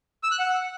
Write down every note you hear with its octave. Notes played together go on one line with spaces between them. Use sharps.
E6
F#6
F#5